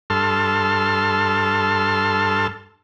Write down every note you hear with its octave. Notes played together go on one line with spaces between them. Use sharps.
G2 A4 A5 C6 F6